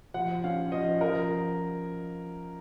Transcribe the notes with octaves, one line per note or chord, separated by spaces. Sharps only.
F3 F#5
C#4 F5
F3 D#5
F3 A#4